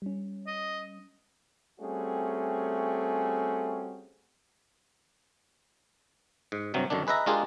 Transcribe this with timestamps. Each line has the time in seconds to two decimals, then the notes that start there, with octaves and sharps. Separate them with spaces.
0.02 G3 C#4
0.47 D#5
1.80 G3 A3 C4 C#4 F#4 G#4
6.52 G#2
6.74 G2 C3 F#3
6.90 F#2 D3 D#3 D4
7.07 G#4 B4 D#5 E5 A#5
7.26 G#3 D4 F4 G4 G#4 A#4